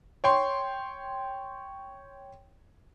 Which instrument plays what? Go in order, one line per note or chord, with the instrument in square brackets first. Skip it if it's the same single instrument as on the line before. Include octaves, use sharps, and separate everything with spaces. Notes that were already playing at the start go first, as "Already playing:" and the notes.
[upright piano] C#5 G5 C6